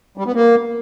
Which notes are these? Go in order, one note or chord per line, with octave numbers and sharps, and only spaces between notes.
G3
B3
A#3